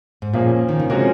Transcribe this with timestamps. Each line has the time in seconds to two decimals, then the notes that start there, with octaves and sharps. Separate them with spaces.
0.22 G#2
0.33 A#2 F3 A#3 C#4 G#4
0.69 D#3
0.80 C#3
0.90 C3 F3 G#3 C#4 F#4 A#4